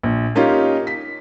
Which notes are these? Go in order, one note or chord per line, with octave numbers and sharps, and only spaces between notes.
A#1
A#3 C#4 D#4 F4 G4
B6